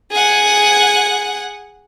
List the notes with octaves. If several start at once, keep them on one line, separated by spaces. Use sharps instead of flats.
G#4 F#5